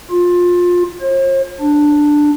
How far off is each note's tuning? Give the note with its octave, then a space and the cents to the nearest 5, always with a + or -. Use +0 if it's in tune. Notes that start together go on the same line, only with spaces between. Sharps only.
F4 +20
C5 +45
D4 +5